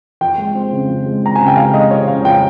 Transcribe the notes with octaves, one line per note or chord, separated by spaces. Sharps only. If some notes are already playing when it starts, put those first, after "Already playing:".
F2 G5
G#3
C4
C#3
F2
G#3
C4 A#5
C#3 G#5
G5
F2 F5
G#3 D#5
C4 C#5
C#3 F5
F2 G5